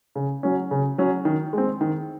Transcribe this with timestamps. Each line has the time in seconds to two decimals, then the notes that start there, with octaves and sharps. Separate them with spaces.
0.15 C#3
0.43 F#3 C#4
0.71 C#3
0.98 F#3 C#4
1.25 D#3
1.53 G#3 C4
1.81 D#3